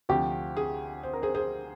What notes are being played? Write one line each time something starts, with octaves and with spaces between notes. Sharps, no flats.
D2 C3 F3 G4
G#4
C5
A#4
G#4 C5
G#4 C5